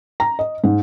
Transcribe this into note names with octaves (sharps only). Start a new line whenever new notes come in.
A#5
D#5
G#2